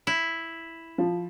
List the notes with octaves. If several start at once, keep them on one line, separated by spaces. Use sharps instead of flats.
E4
F3